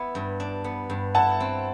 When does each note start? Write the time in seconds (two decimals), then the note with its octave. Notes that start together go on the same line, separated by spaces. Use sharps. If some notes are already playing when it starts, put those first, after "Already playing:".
Already playing: B3 E4
0.15 G2
0.40 D4
0.64 B3
0.90 G2
1.14 E4 F#5 A5
1.40 C4